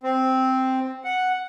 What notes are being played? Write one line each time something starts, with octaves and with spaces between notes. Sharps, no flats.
C4
F#5